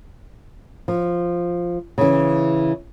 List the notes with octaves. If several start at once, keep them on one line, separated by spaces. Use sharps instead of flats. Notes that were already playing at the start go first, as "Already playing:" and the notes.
F3
C#3 E3